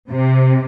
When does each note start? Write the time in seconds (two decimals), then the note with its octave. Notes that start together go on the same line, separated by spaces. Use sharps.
0.11 C3